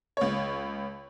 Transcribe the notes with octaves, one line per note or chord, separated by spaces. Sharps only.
C#2 C#5